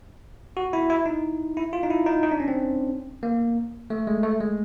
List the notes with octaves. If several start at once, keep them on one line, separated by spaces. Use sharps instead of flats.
F#4
E4
E4
D#4
E4
F4
D#4
E4
D#4
D#4
D4
C#4
C4
A#3
A3
G#3
A3
G#3